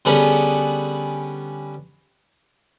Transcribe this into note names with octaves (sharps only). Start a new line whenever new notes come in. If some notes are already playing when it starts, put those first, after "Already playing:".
D3 G3 B3 C#4 G#4 B4